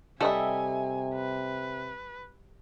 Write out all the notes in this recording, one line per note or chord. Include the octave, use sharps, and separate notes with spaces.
C3 G3 A4 D#5 E5 G#5
B4